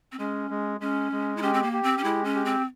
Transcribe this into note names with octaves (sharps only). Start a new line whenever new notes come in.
C4
G#3 C#4
G#3
G#3 C#4
G#3
E4
C#4 G4
C4
A#3
G4
C4
C#4
G#3 E4
C#4
G4
C4